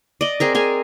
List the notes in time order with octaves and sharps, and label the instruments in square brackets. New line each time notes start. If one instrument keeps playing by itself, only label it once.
[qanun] D5 D#5
C4 G#4 A#4
G#4 A#4 G#5